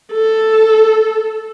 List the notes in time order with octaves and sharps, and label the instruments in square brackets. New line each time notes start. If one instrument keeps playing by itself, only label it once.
[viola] A4